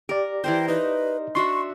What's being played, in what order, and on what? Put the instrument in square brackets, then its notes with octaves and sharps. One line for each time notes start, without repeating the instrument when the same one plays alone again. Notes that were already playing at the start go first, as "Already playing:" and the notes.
[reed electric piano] G4 D5 [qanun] A#4
[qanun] E3 A#4 C5 [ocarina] G5
[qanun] D#4 [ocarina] B4
[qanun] D4 F#4 E5 [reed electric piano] C6 [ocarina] C#6